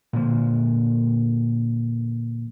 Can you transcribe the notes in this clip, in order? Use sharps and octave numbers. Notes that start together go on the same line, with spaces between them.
A#2 D3 F3